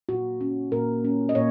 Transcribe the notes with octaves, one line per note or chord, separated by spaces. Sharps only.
A#2 F#4
C#4
A#2 A#4
C#4
D#5
A#2 C#5